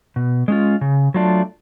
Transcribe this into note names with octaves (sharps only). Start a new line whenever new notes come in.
B2
G#3 C#4 F4
C#3
F#3 A3 D4 F4